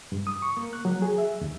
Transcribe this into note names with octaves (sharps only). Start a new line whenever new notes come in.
G2
D#6
C#6
A#3
F#6
F#3
G#4
E5
D#2